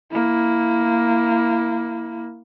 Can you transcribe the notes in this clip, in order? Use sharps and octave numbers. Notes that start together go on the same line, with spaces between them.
A#3 E4